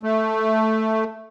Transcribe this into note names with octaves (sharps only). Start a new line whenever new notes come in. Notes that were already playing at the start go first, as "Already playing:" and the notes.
A3